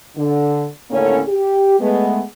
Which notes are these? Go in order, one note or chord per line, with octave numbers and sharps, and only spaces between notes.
D3
D#2 A2 D3 A#3 C#4
G4
G#3 A3 B3